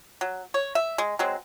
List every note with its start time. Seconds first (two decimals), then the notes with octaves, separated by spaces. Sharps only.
0.21 F#3
0.54 C#5
0.75 E5
0.98 G#3
1.19 F#3 G#3 C4